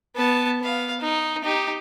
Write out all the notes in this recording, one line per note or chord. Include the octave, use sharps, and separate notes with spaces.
B3 A5
B3 F5
D#4
D#4 G4